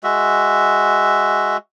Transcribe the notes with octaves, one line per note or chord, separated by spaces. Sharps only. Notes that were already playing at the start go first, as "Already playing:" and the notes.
G#3 F#4 E5